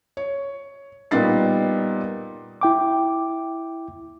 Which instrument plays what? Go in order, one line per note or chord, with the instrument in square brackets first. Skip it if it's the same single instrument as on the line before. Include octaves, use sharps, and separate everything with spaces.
[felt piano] C#5
A#2 G3 B3 D#4 A6 C7
[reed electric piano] E4 G5 D6